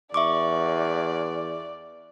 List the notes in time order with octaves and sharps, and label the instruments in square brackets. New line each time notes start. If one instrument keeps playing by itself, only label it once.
[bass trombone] E2 [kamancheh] D5 [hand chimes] E5 C#6 D6